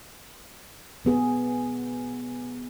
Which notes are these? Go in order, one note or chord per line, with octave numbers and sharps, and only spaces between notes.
B2 B3 G#4